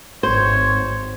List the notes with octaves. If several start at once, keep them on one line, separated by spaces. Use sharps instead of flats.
G#1 C5 C#5